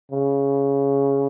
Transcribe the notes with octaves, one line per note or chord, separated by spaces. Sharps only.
C#3